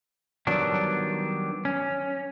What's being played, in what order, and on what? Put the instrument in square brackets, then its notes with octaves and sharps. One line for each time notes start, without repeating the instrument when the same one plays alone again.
[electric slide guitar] D#3 F#3 G3 B3 D4
C#4